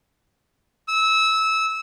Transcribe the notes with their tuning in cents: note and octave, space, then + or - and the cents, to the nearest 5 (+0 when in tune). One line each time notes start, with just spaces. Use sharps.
E6 -20